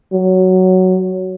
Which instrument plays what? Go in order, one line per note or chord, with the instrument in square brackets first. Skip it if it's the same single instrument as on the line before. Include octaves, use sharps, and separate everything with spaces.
[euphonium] F#3